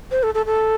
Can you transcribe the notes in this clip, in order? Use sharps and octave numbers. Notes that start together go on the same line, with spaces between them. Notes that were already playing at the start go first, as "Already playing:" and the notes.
C5
A4
A4
A4